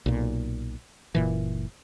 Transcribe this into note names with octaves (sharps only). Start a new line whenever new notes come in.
B1 A#2
F#1 A#2 E3